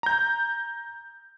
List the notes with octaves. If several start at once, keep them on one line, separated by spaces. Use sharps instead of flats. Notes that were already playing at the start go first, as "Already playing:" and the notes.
A#5 G6